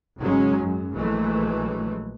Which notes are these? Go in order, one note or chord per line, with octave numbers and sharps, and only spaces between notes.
G#1 C#3 F#3 G#3 C#4
F#2
A#1 E3 F#3 G#3 A3